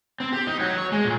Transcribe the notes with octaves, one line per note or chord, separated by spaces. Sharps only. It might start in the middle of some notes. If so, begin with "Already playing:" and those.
C4
G4
D#4
F#3
C#5
G#3
A#2